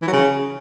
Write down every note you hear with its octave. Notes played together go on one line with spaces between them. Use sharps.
E3
F#3
C#3